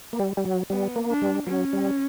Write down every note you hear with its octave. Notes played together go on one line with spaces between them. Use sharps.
A#3
G3
G3
F#3
G3 B3
A#3
D4
G3
F#3 C#4
G3